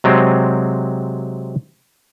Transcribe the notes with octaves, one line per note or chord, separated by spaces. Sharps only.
C3 F#3 G#3 C4